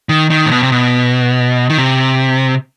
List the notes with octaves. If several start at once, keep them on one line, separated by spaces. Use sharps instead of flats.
D#3
D#3
A2
B2
C3
B2
D#3
C3